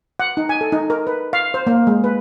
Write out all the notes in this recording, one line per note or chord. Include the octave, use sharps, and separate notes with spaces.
F#5
D#4
G#5
A4
D#4
A#4
B4
F5
C5
A#3
G#3
B4